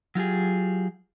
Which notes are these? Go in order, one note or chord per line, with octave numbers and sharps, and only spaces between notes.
F#3 F4 G4 G#4